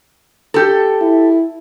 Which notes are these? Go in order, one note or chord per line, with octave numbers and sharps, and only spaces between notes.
G4 A4
E4